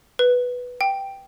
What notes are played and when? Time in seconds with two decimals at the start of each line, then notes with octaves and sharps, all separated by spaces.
0.19 B4
0.81 G5